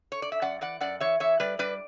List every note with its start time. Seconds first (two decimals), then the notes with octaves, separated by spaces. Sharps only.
0.12 C#5
0.22 D5
0.32 E5
0.42 F#2 D5 F#5
0.61 E3 D5 F#5
0.80 F#2 D5 F#5
1.00 E3 C#5 E5
1.20 E3 C#5 E5
1.40 G3 B4 D5
1.59 G3 B4 D5